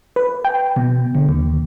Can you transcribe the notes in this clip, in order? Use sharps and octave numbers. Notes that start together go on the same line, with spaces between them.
B4
G5
B2
D3
D#2